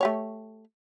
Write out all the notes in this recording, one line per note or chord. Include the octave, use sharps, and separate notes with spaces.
A3 G4 C#5